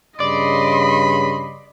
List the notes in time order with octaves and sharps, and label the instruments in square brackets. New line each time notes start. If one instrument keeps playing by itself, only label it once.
[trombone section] G2 C#3 [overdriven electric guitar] D5 [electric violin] D#5 C6 [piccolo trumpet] B5